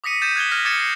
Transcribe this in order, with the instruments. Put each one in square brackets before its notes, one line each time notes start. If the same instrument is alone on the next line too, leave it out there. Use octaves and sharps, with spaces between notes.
[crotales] D6 D#6 A#6 B6 C#7 D#7
D#6 G6 A6 B6 D#7 E7
F#6 G#6 B6 E7 G7
F6 G#6 A#6 B6
D6 D#6 G#6 A6 C#7 E7
A#6 C7 C#7